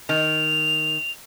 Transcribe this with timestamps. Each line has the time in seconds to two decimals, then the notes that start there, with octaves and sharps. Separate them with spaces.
0.09 D#3 F7